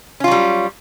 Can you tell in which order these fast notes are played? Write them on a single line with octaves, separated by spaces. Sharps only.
C#4 F4 F#3 G3